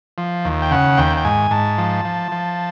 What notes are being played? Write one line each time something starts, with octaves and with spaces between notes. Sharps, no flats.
F3
D#2
G5
C#3 F#5
D#2 G5
G5
G#2 G#5
G#2 A5
F3
F3
F3